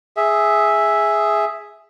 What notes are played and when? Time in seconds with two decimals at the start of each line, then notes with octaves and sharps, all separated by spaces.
0.17 G#4 E5